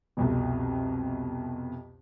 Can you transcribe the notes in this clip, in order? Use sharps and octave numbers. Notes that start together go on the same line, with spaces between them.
C2 F2 B2